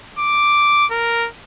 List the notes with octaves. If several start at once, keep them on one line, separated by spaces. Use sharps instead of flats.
D6
A#4